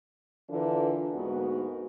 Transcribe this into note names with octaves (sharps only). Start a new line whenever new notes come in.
D3 E3 D4 F4 A#4 B4
D2 G#2 A#3 B3 F#4 A#4